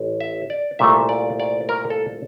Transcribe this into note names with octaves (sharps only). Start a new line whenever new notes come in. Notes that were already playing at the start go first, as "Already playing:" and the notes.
Already playing: A1
E5
D5
C2 A#2 A3 E5
D5
D5
A#4
A4